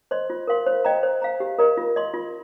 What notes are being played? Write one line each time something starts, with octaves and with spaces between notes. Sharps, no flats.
C5 D#5 C6
F4
A#4 F5 C6
C5
D#5 G5 A#5
C5
F5 A#5
G4
A#4 D#5 A#5
F4
D#5 C6
F4